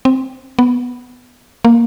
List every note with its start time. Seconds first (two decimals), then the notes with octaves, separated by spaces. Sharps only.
0.05 C4
0.59 B3
1.65 A#3